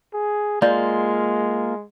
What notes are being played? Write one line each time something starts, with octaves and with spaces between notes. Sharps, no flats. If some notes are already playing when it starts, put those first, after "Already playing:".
G#4
G#3 A#3 F4 D5